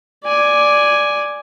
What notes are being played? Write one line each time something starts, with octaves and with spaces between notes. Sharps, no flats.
D5 G#5